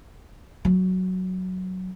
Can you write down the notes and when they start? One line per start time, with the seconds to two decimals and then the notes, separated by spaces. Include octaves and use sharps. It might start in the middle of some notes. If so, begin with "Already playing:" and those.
0.65 F#3